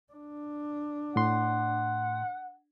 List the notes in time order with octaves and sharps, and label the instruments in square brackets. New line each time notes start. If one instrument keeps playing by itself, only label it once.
[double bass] D4
[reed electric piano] A2 C6 [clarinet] F#5